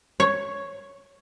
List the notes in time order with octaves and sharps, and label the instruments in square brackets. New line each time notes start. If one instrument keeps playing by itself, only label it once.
[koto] C#5